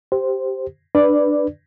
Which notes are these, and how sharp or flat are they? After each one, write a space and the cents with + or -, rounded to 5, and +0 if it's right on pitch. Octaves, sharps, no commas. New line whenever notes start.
G4 -5 C5 +0
D4 +15 B4 +0 D5 +0